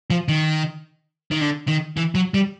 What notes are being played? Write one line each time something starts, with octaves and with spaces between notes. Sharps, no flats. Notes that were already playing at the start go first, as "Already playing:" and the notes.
F3
D#3
D#3
D3
D#3
E3
F#3
G3